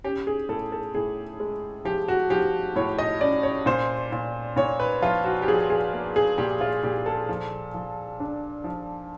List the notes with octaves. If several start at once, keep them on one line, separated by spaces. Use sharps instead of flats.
C#4 G4
G#4
A2 A4
A4
A2 G#4
G#3
F3 G4
F#4
F3 G4
A2 C#5
D#5
C#4 D5
C#5
A#2 C5
A#2
A#2 C#5
B4
F3 F4
F#4
G4
F3 G#4
G#4
A#3
G#4
A#2 G4
F4
A#2 G4
A4
F3
F3
D4
F3